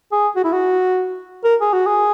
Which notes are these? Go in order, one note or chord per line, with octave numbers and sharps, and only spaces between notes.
G#4
F#4
E4
F#4
A#4
G#4
F#4
G#4